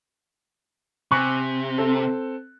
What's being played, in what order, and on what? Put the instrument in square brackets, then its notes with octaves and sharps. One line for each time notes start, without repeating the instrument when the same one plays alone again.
[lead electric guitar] C3 [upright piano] G#5 C#6 F#6
[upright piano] C4 A4